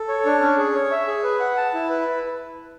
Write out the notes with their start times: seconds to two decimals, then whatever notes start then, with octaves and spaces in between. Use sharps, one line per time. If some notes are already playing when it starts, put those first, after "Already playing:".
Already playing: A4
0.08 C#5
0.25 D4
0.41 C#4
0.58 G#4
0.75 C#5
0.91 E5
1.07 G#4
1.23 B4
1.40 F#5
1.57 A5
1.74 E4
1.89 B4